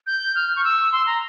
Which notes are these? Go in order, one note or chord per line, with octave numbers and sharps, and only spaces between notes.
G6
F6
C#6
E6
C6
A#5